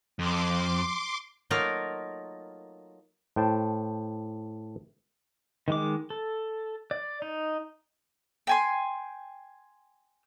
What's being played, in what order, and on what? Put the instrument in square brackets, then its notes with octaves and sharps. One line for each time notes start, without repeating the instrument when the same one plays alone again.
[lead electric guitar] F2 [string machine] C6 D6
[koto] F#3 A3 A#3 D#4 F4 A#4
[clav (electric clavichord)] A2 C5 G5 A5
[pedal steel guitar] D#3 G#3 D6
A4
D5
D#4
[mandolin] G5 G#5 C6